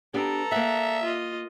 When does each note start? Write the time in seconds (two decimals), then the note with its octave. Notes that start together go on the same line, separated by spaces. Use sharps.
0.14 B3 D4 G4 A4 A#5
0.52 A#3 E5 F#5
1.03 F4 D#5